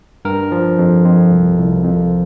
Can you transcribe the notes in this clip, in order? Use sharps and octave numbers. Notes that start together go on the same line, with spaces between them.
G2 A#4
F3
F2
F2
C2
C2
F2